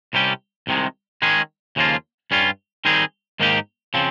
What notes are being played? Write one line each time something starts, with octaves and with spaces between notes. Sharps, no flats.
C2 C3 G3 C#4 G4
C2 C3 D#3 G#3
D#3 G#3 C#4 G#4
D#2 C#3 F3 A#3 F4
G2 G3 C#4 F4
D#3 G3 C4 D#4 G#4
G#2 D#3 A#3 D#4 G4
C#3 F3 C4